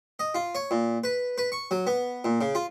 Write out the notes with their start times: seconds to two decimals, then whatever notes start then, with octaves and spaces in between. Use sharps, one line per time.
0.19 D#5
0.35 F4
0.55 C#5
0.71 A#2
1.04 B4
1.38 B4
1.52 C#6
1.71 F#3
1.87 B3
2.25 A#2
2.41 C#3
2.55 F4